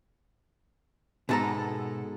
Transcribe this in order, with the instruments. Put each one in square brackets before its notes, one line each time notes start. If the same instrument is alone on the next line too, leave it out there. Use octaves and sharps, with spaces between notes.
[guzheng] G#2 B3 A4 [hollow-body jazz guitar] B2 A5 A#5